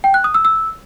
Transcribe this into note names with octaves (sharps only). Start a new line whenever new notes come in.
G5
F#6
D#6
E6
E6